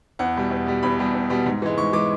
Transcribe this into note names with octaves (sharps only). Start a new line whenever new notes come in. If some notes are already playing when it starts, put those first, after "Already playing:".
E2 F#5
B2 G3
E2
B2 G3
E2 B5
B2 G3
E2
B2 G3
G#2
E3 G#3
G#2 C#6
E3 G#3 D6